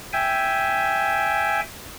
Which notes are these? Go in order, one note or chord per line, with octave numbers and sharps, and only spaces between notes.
E5 G5 G#5